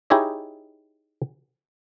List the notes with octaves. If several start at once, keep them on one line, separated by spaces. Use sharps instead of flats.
D#4 E4 G4 G#4 C#5 D#5